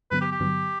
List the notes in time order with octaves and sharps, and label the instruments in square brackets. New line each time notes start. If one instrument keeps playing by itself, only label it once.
[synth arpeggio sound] G2 D3 F#3 B3 [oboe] B4
[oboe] G4
G4
[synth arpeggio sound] G2 D3 F#3 B3